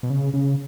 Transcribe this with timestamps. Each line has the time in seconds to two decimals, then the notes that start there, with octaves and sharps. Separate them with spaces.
0.03 B2
0.10 C#3
0.34 C#3